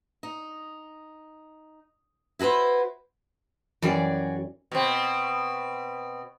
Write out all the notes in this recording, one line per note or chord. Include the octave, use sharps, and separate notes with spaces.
D#4
E4 F#4 G#4 B4 C5
F#2 E3 G3 F#4 G#4 D5
B2 C4